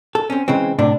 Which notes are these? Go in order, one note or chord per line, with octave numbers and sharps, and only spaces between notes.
A4
C4 C#4
C#3 E3 G#3 C4
A2 C3 D4